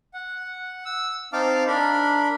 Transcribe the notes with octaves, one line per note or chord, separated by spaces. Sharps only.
F#5
E6
C4 D#4 F5 A5 D6 F6
D4 A#4 B5